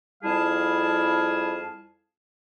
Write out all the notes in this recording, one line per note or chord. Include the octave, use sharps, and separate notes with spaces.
F2 G3 E4 G#4 F5 A5